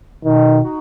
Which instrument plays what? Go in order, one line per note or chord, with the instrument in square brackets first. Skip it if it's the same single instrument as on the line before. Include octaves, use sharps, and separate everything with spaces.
[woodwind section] B2 [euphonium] D#3
[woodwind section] D#4 F#4